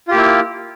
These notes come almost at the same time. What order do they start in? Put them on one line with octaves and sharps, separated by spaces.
F4 G4 A#3 E4